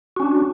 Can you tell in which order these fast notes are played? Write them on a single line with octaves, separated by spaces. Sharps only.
F#4 C#4 D4